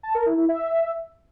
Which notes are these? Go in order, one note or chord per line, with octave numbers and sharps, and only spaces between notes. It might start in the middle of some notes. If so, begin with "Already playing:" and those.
A5
A#4
E4
E4
E5